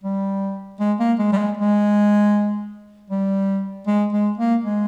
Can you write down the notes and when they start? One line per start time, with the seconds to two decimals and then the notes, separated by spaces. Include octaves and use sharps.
0.03 G3
0.80 G#3
1.00 A#3
1.19 G#3
1.32 G3
1.37 G#3
1.57 G#3
3.10 G3
3.87 G#3
4.12 G#3
4.38 A#3
4.64 G#3